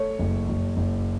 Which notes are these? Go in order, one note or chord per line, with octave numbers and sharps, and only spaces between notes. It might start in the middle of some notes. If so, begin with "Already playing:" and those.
Already playing: A3 C#5
F#1
F#1
F#1